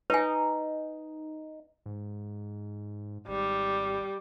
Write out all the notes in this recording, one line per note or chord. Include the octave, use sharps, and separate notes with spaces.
D#4 B4 G#5
G#2
G#1 G3